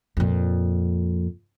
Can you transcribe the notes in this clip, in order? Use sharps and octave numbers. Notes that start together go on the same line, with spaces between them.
F2 A#2